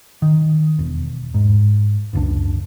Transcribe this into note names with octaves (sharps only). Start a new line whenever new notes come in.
D#3
E1
G#2
F#1 C#2 D4